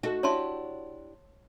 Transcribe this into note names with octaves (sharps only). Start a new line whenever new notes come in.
D#4 F#4 A4
D4 E4 G4 C#5 A5 C6